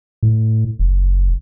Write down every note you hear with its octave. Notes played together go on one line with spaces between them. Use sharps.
A2
F#1